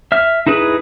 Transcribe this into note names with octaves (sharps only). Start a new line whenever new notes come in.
E5 F6
D#4 E4 G#4 B4